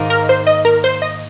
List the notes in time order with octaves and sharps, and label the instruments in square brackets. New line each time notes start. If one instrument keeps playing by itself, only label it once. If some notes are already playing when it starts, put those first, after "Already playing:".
Already playing: [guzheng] G#2 D#3 A#3 D#4
[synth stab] A#4
C5
D#5
A#4
C5
D#5